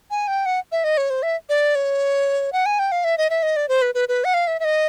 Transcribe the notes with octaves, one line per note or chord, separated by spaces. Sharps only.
G#5
G5
F#5
E5
D#5
C#5
C5
E5
D5
C#5
F#5
G#5
G5
F5
E5
D#5
E5
D#5
D5
C5
B4
B4
B4
F#5
F5
E5
E5
D#5